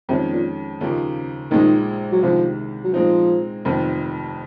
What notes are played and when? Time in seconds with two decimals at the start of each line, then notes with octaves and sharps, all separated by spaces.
0.09 F2 C3 D#3 G#3 C#4
0.33 A#2
0.81 D#2 C#3 F3 A#3 D#4
1.51 A#1 A#2 D#3 G#3 D#4
2.12 F#3
2.23 C2 C3 D#3 F3 G#3
2.84 F#3
2.93 A#2 F3 G#3 C4 D#4
3.65 F1 F2 D#3